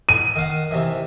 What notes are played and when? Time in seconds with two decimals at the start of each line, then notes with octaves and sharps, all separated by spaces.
0.09 D#7
0.36 D#3 F5 F#5
0.71 C3 D#3 E3